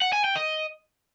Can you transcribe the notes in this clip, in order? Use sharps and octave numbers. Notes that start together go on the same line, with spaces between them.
F#5
G#5
G5
D#5